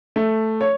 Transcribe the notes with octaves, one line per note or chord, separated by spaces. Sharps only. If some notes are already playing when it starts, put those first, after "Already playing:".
A3
C#5